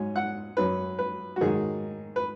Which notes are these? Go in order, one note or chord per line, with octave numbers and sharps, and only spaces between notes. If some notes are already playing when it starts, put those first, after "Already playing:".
Already playing: G#2 F#3 C#4 G#5
F#5
F#2 F#3 C#4 B4
B4
F#4
G#2 D#3 F#3 G#4
B4